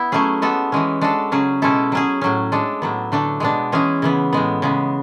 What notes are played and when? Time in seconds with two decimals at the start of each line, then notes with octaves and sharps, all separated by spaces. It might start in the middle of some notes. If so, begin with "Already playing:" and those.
Already playing: B3 E4
0.12 F#3 A3 C#4 G#4
0.42 G#3 B3 F#4 A4
0.72 E3 G#3 C#4
1.01 G#3 D4 F#4 A4
1.32 C#3 F#3 C#4 G#4
1.62 B2 G#3 C#4 E4 A4
1.92 F#3 C#4 G#4
2.22 A2 F#3 C#4
2.52 G#3 D4 A4
2.82 A2 F#3 B3
3.12 D3 A3 D4
3.40 B2 G#3 B3 D4
3.72 E3 G#3 C#4 G#4
4.02 C#3 E3 B3
4.33 A2 G#3 B3
4.62 C#3 G#3 B3